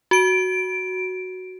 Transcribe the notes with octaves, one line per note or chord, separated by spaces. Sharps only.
F#4 D7